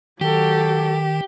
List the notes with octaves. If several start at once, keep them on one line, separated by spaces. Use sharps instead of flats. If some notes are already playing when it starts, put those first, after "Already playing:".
D#3 F#3 G4 A4